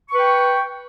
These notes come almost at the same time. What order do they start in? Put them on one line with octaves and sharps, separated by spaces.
C#6 B4 G5